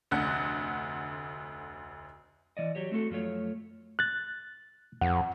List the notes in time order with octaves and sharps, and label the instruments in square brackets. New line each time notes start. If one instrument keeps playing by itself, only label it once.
[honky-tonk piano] F1 D2 F#5 F#6
[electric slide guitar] E3 D5 D#5
F#3 G4 C#5
A3 C4 F#4 A4
F#2 F3 A3 C#5
[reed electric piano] F#6 A6
[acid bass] F2 [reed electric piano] F#5